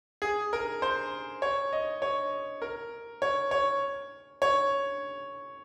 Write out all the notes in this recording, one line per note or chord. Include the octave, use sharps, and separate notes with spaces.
G#4
A#4
C5
C#5
D#5
C#5
A#4
C#5
C#5
C#5